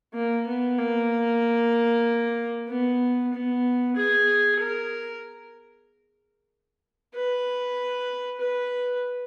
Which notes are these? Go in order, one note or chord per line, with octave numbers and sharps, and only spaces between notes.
A#3
B3
A#3
B3
B3
G#4
A#4
B4
B4